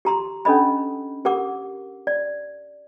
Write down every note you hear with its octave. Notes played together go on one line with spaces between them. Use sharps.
G4 A#5 C6
C#4 D4 A4 D#5 B5
G4 A#4 F#5 D6
D5